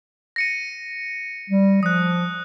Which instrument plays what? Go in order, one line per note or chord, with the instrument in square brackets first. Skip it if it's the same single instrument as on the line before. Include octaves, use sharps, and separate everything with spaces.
[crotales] A#6 C#7 D#7
[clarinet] G3
[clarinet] F3 [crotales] D#6 F#6